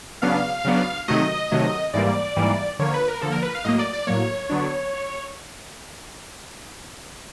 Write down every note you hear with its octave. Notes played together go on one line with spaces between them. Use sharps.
C#3 F#3 B3 D4 F5
C#3 F#3 B3 D4
C3 D#3 F#3 A3 D#5
C3 D#3 F#3 A3
G#2 E3 G3 A#3 D5
G#2 E3 G3 A#3
D3 F3 A#3 C#5
B4
A#4
D3 F3 A#3 A4
A#4
B4
F5
A2 F#3 A#3 D#5
D5
D5
A2 F#3 A#3 C#5
D3 F#3 B3 D4